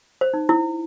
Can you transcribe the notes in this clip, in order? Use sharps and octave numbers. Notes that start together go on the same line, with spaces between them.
C5
D#4
E4